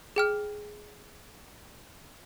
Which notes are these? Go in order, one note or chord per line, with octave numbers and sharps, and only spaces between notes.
G#4 G5 F6